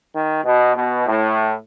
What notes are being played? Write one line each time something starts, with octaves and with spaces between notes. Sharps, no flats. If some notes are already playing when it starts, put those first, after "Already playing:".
D#3
B2
B2
A2